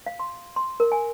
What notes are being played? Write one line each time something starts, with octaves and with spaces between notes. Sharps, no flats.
F5
C6
C6
A#4
G#5